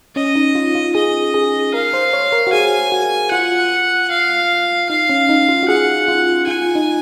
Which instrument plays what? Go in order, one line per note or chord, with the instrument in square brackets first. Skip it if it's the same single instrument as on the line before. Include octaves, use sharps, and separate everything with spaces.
[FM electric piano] C#4 [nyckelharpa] D#5
[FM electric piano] D#4
F4
F4
[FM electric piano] G#4 [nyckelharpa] D#5
[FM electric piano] G#4
[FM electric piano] A#4 [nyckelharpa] F5
[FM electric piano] C5
C#5
A#4
F#4
[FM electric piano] G#4 [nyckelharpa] G#5
[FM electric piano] F#4
[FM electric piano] F4 [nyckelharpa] F#5
[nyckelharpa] F5
[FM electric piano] D#4 [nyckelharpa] F5
[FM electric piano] C#4
D#4
F4
F#4
[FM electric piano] G#4 [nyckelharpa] F#5
[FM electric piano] F4
[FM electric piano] F4 [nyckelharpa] G#5
[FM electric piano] D#4